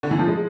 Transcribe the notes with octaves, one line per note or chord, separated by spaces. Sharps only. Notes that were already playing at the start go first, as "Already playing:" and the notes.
D3
E3
F3
G#3